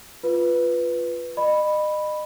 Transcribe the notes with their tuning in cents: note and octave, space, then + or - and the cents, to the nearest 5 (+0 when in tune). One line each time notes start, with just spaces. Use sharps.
F4 +0 B4 +0
D#5 -35 B5 +0